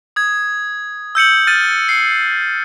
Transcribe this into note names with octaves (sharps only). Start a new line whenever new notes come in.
D#6 G#6
E6 G6 C#7 F#7
F6 A6 D#7
C7